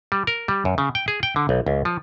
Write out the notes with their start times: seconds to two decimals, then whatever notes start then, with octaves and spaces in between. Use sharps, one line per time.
0.12 G3
0.27 A#4
0.48 G3
0.65 F#2
0.78 C#3
0.95 G5
1.08 G#4
1.23 G5
1.36 D3
1.49 B1
1.67 C#2
1.85 F3